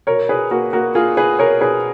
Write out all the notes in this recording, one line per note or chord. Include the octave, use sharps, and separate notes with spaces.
B2 A#4 C#5
B2 G#4 B4
A#3 F#4 A#4
A#3 F#4 A#4
A#3 F4 G#4
B2 G#4 B4
B2 A#4 C#5
B2 G#4 B4